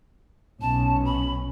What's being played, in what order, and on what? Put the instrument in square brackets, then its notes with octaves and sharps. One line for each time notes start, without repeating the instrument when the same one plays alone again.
[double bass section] B1 B2 C#4 [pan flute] A5
[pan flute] B5